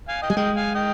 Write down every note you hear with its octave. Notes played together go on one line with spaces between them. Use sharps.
F5 G#5
D#5 G5
G3 G#5
G#3 D#5 G5
F5 G#5
D#5 G5